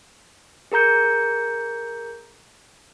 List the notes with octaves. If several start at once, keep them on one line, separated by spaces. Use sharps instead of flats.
G#4 A#4 A#5 G6 C#7